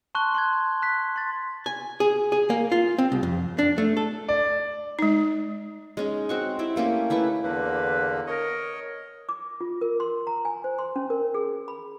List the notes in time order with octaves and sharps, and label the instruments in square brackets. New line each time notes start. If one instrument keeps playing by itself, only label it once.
[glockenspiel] A5 C6 C#6 F#6 G7
C6 F#6 G#6
F#6 B6
C6 A6
[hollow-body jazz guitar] G#5
G#4
G#4
A#3
F4
C4
C2
F2
D4
A3
A4
[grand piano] D5
[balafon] G#3 D#4
[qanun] G#3 C#4 D#4
C4 F#4 C#6
C4 E4 G4
A3 A#3 C#4 G4
A3 E4 B4 E5
[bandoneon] E2 D3 A#3 [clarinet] B4
[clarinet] A#4 [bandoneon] C#5 D#5
[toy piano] D6
F4
A#4
C6
A#5
G#5
C5
C6
C#4
A#4
G#4
B5